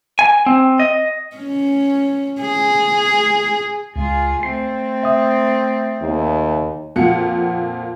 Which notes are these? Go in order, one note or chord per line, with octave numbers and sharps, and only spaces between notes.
G#5
C4
D#5
C#4
G#4
C#2 F4 G#4
A3 C4 C7
E5 D#6
D#2
F2 A#2 F3 F#5 C#7